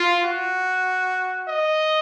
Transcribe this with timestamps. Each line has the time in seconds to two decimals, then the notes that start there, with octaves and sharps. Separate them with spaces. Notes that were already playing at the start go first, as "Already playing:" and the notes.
Already playing: F4
0.23 F#4
1.47 D#5